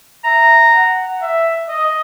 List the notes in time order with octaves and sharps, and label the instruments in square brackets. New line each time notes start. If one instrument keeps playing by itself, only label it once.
[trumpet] E5 [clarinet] A#5
[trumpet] F#5
E5
D#5